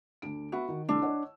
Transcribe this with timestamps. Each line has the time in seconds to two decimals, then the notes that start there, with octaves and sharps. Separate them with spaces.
0.22 D2 D4 D7
0.52 B3 F#4 E5 B5
0.68 D#3
0.89 C2 A3 D4 E6
1.02 C#5 D#5 F#5